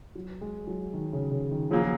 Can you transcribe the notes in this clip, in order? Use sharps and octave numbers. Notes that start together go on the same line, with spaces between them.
F#3
G#3
F#3
D#3
C#3
C#3
D#3
C#3 F3 F#3 A#3 F4 G#4